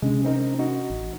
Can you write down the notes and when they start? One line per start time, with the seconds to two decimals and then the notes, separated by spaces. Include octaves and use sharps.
0.02 C3 G#3 C#4 D4
0.24 C4 D#4 A#4
0.59 D#4 F#4
0.90 A1